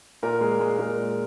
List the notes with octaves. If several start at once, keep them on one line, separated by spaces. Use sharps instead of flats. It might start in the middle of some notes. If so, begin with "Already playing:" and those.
A#2 A#4
G#3
G#3
G#3 A#4
A#2